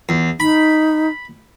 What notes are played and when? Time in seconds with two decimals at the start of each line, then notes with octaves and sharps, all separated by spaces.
0.09 E2
0.40 D#4 B5